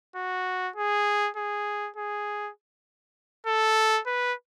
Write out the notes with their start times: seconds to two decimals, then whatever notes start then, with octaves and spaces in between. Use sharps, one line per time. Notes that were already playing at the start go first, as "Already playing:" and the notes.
0.16 F#4
0.76 G#4
1.37 G#4
1.96 G#4
3.47 A4
4.07 B4